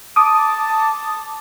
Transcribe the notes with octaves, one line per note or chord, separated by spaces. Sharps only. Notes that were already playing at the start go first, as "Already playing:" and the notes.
A5 D6 D#6